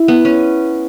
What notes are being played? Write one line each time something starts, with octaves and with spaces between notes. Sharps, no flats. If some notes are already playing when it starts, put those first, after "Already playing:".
Already playing: E4
B3
C#4